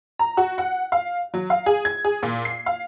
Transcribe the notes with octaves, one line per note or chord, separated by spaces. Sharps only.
A#5
F#4
F#5
F5
F#3
F5
G#4
G#6
G#4
A#2
C7
F5